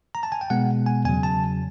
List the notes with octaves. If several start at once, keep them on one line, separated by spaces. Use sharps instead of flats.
A#5
A5
G#5
G5
B2 G#3 B3 F#5
G#5
E2 C#3 F#3 G#5
A5